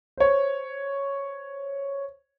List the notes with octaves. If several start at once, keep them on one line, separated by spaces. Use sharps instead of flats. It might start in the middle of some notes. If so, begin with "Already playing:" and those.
C5 C#5